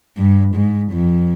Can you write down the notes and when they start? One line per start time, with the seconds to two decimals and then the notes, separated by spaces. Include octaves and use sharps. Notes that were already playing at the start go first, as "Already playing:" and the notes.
0.17 G2
0.55 G#2
0.92 F2